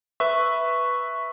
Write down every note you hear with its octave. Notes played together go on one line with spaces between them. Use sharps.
B4 E5 C#6